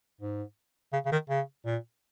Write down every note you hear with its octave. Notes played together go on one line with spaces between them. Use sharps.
G#2
C#3
C#3
D#3
C#3
A#2